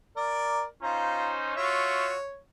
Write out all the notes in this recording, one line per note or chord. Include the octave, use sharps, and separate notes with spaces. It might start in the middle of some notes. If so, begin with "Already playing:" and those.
A#4 D5
C#4 D#4 F4 C5 A#5
F4 F#4 C#5 E5